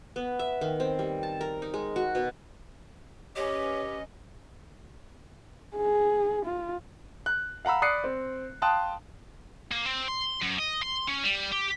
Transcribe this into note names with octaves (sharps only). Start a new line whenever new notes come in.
B3
E5
D#3
C4
G3
A5
A#4
D#4
G#3
F#4
B2
C#4 G4 B4 C#5 D#5
G#4
F4
F#6
F5 F#5 A#5 B5 E6
D5 B5 D#6 F#6 C7 C#7
C4
F5 G5 A5 C6 D#6 F#6
A#3
C4
C6
F#2
D#5
C6
C#4
G3
G4